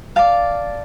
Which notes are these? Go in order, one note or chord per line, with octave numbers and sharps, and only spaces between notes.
D5 F5 A5